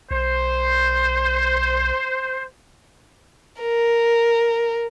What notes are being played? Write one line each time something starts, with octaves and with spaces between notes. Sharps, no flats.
B1 C5
A#4